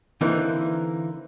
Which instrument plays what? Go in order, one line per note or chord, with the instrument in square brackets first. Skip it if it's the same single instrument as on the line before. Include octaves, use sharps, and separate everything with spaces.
[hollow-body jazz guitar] D3 E3 A#3 C4 D#4 A#4